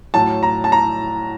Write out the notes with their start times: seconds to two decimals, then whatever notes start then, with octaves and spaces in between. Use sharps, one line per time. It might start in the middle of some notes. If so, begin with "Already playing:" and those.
0.14 A2 F#3 A5
0.43 A#5
0.64 A5
0.72 A#5